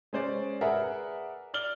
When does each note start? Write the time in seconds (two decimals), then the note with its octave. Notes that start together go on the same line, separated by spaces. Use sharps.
0.13 G#3 C#4 C5 D5
0.61 G#4 A#4 B4 D5 E5 F#5
1.54 D5 F6 G7